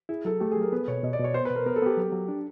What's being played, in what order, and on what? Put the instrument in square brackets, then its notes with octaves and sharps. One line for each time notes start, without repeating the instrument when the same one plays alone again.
[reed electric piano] E4 [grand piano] G#4
[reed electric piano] F#3 [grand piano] A4
[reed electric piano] A3 [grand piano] G4
[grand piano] G#4
[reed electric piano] F#3 [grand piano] A#4
[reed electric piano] B3 [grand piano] B4
[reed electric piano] B2 [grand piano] C#5
[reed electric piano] B2 [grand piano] D#5
[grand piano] D5
[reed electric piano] B2 [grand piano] C#5
[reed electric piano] B3 [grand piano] C5
[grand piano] B4
[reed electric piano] B2
[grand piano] A#4
[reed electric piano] B3 [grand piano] A#4
[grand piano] A4
[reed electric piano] B3 [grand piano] G4
[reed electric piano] F#3
F#3
D4